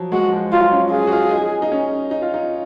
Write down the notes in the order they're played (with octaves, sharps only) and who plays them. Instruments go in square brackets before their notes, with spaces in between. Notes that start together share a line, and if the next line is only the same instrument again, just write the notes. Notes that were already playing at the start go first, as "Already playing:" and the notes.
Already playing: [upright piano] F3 F#3
[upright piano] G#3 [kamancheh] F#4
[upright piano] F3
[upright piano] F#3 [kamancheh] F4
[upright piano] C#4
[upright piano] F4 [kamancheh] G#4
[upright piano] F#4
F4
D#4
D#4
C#4
D#4
F4
D#4